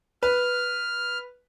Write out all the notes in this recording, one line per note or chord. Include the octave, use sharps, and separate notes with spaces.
B4 F6